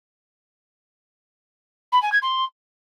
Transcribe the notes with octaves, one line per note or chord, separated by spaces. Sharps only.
B5
G#5
G#6
C6